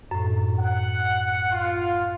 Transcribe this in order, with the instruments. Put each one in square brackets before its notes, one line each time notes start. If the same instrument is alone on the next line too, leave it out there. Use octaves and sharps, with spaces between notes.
[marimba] F#2 A2
[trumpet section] F#5
F4